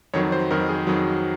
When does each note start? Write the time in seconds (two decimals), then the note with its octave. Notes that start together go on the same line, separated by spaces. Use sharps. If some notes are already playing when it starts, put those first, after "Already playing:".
0.14 F2 D#3 F#3 C#5
0.32 C5
0.51 F2 D#3 F#3 A#4
0.69 G#4
0.87 F2 D#3 F#3